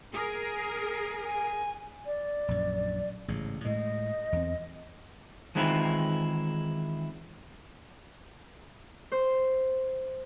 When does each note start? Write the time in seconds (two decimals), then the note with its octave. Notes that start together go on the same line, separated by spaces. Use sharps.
0.13 G#4 A#4
1.26 G#5
2.06 D5
2.48 A#1 F#2
3.28 A1 G#2 C#3
3.65 A2 G#3 D#5
4.32 E2 C4
5.55 D#3 E3 G#3 C4 E4 F4
9.12 C5